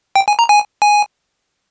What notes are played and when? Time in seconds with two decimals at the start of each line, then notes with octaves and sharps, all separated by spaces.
0.16 G5
0.28 G#5
0.39 A#5
0.49 G#5
0.82 G#5